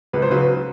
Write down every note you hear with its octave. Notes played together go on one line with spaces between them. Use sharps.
C#2 B4
C5
C#3 F#3 B4